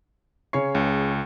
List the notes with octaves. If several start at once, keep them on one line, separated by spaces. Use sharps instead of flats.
C#3 C#5 C#6 C7
C#2